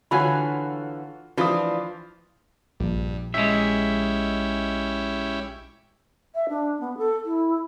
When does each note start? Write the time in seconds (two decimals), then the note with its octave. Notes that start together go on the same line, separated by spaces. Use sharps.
0.11 D3 E3 F4 F#4 C#5 G#5 B5
1.37 E3 F3 D4 F4 D#6
2.80 A#1 G2
3.34 G#3 C#4 E4 G4 E5
6.35 E5
6.49 D4
6.80 B3
6.97 A4
7.25 E4